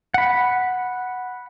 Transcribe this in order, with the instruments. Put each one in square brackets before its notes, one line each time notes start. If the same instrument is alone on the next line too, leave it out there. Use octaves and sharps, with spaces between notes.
[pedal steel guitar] F#5 B5